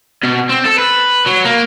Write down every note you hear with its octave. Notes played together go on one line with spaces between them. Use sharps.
B2
C4
A4
B4
F#3
A#3